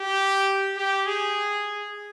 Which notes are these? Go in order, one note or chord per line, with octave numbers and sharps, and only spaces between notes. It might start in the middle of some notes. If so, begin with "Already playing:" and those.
Already playing: G4
G4
G#4